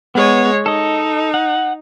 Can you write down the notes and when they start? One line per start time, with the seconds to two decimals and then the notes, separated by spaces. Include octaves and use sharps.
0.15 G#3 B3 C#5
0.66 D#4 A4 D#5
1.34 F#5